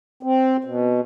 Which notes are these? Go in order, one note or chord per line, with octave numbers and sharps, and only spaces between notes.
C4
B2